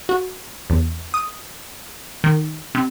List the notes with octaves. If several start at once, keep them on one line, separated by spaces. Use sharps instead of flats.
F#4
E2
D#6
D#3
C3